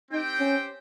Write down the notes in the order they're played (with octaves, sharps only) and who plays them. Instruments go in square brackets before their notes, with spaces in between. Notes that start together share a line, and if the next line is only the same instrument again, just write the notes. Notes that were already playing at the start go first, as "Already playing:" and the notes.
[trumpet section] C4 G4 C5 G5 [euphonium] D#4
[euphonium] C#4